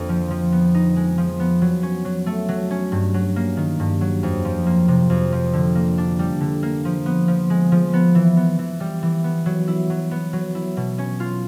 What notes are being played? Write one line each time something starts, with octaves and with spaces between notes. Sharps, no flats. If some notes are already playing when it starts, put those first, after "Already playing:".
Already playing: F2 D3 A#3
F3
F3
B3
D#4
G#3
F3
B3
F#3
C#4
F#3
A3
F#3
C#4
G2
F#3
A#3
D#3
G2
F#3
F2
F3
A#3
C3
F2
F3
D3
A#3
D4
G3
D3
A#3
F3
B3
F3
G#3
F3
B3
E3
B3
E3
G3
E3
B3
F#3
E4
F#3
B3
F#3
E4
B2
C#4
F4